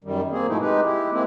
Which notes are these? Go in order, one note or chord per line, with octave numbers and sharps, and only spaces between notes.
F#2 D#3 G3
A#3 C4 G#4
G#2 B2 F3 A3 D#4 E4
G#3 D#4 G4 B4
E4 G4
G#3 A#3 C4 E4